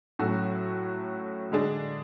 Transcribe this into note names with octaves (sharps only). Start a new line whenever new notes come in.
A2 F#3 C#4 F#4 A4
D3 G#3 D4 G#4